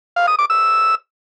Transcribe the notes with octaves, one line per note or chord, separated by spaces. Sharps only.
F5
D#6
D6
E6